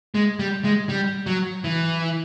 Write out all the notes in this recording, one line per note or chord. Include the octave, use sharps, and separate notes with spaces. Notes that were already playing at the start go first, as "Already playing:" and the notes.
G#3
G3
G#3
G3
F#3
E3